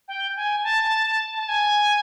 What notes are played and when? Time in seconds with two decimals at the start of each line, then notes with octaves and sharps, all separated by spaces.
0.08 G5
0.36 G#5
0.64 A5
1.37 A5
1.49 G#5